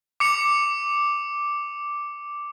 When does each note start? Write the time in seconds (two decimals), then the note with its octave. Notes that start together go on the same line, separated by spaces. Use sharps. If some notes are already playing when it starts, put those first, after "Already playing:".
0.20 D6 C#7 F7